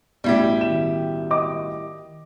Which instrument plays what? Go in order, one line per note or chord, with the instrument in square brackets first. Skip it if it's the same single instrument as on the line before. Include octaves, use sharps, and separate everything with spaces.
[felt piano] A1 B2 [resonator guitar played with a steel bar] G3 E4 G4
[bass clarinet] D#3 [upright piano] E7
[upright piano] D#5 D6